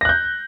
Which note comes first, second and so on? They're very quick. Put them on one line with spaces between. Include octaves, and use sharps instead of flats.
A#6 F#6 G6